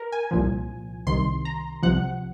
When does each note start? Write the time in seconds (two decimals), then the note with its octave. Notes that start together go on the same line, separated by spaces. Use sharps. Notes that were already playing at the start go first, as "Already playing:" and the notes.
Already playing: A#4
0.12 G#5
0.31 C2 A#2 F3
1.07 C2 C3 D#3 C6
1.45 A#5
1.83 C2 C3 F3 F#5